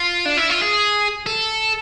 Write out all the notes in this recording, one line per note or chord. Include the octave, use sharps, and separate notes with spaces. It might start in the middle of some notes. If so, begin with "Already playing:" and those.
Already playing: F4
D4
E4
F4
G#4
A4